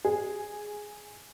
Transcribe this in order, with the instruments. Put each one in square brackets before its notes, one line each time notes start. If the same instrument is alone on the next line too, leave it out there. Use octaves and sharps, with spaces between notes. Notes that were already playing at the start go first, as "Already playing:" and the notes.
[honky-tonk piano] G#4